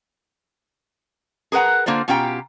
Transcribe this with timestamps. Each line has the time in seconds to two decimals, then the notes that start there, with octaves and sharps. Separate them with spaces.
1.52 G#4 A#4 B4 F#5 A#5
1.86 D3 A#3 F4 C5 D5
2.08 B2 C#4 F4 G4 G5 A#5